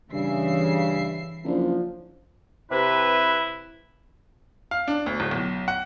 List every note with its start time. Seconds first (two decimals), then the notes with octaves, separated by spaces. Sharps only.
0.12 G2 C#3 E3 E5 C7
1.44 F#1 F3 D4
2.71 C3 E4 B4
4.71 F5
4.88 D4
5.06 D2
5.20 D1
5.31 B1
5.68 F#5